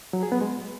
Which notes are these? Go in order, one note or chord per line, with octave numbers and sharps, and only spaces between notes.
F#3
G#4
B3
G#3